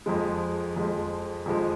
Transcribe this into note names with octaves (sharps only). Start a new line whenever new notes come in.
F2 F3 G#3
F2 F3 G#3
F2 F3 G#3